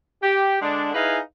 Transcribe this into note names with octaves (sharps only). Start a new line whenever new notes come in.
G4
D3 G#3 D4
D#4 E4 G#4 B4 F5 G#5